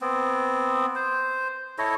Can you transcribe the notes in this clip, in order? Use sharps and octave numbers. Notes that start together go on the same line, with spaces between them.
B3 C4
C5
E4 A4 C#5 D#5